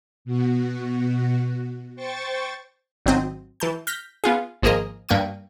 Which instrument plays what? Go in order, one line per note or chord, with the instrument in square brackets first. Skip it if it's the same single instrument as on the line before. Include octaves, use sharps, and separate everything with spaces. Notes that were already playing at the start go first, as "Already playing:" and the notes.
[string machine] B2 F#4
C5 G5 C#6 A6
[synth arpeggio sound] G#1 F#3 C4 D#5
E3 A5 G6
F6 G6 A#6 B6
B3 F4 G#4
G#1 F3 A#3 G#4 A#4 D#5
G2 A#3 G5 C#6 D#7